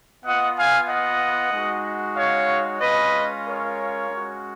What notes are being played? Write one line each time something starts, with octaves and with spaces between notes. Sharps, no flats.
B3 F4 D#5 F#5
F5 G#5
D#5 F#5
G#3 D#4 F#4
C#5 F5
G#3 C#4 F4 B4 D#5
A#4 C#5
G#3 C#4 F#4